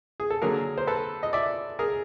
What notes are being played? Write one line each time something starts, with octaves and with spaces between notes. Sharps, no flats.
G#4
A4
D3 F#3 A#3 G#4 A#4
C5
A4 B4
D#5
D5 E5
G#4 A#4